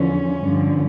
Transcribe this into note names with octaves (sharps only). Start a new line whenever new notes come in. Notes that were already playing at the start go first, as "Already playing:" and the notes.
Already playing: E2 D3 F3 C#4
G2 D3 F3